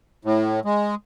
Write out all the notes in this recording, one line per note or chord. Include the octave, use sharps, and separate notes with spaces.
A2
G#3